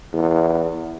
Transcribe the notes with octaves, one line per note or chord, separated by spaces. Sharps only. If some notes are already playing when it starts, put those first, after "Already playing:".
E2